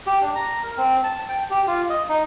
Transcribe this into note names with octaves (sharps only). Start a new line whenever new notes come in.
G4
D4
A#5
A#4
C4
A5
G5
G4
F4
D#5
D#4